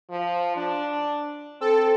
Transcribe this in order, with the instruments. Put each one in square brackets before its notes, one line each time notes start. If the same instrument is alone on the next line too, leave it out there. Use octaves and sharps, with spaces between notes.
[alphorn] F3
D4
[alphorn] C4 [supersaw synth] A4